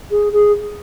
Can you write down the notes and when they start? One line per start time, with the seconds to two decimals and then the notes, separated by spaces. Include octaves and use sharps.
0.11 G#4
0.33 G#4